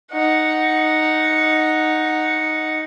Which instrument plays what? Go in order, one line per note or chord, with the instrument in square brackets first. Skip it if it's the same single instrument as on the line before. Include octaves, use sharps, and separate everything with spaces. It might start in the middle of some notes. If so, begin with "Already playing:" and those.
[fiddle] D#4 F#5